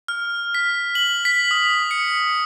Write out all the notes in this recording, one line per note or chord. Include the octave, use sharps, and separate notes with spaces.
F6
B6
F#7
B6
D#6
C#7